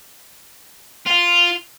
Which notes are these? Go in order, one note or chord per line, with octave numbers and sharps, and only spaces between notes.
F4